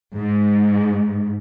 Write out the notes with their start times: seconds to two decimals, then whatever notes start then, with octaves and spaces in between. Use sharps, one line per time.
0.16 G#2